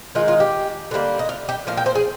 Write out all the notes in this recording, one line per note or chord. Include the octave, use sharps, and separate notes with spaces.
D#3 G#3 D#4 F4
F4
G4
D3 G3 A#3
D#4
F4
G4
A#2 F3 F5
G5
C5
G#4